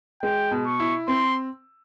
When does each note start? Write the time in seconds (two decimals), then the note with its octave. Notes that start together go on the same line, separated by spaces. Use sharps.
0.22 G#3 G5
0.51 B2
0.66 C#6
0.80 E4
1.08 C4 C6